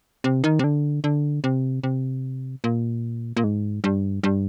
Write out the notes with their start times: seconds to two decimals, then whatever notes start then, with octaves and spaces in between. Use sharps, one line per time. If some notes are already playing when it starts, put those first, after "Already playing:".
0.24 C3
0.44 D#3
0.59 C3
0.64 D3
1.04 D3
1.44 C3
1.83 C3
2.64 A#2
3.36 A#2
3.44 G#2
3.84 G2
4.23 G2